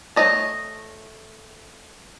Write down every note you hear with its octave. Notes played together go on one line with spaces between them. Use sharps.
A3 A4 C#5 D#5 A5